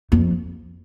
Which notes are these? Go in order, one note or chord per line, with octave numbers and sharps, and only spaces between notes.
F2